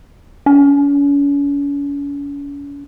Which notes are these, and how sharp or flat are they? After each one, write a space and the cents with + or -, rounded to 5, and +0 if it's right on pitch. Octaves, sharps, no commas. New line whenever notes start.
C#4 +40